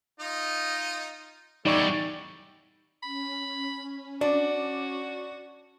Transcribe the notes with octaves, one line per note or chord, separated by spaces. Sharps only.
D#4 F4 D#5
E2 G3 A3 D#4 C#5 D5 C#6
C#4 B5
D4 F#4 D5